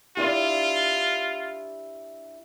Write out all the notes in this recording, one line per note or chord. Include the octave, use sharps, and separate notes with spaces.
D4 E4 F4 G4